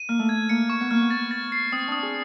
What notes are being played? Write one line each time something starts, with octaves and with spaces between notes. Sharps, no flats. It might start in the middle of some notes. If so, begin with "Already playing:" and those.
Already playing: D#7
A#3 F6
A3
G#6
A#3 C#7
C#6
B3
A#3 F6
B3
A6
A6
C7
C4 D#6
D4 D#6
G#4